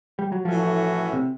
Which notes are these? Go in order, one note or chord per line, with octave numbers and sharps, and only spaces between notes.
G3
F#3
A2 E3 F3 A3 C#4 F#4
C3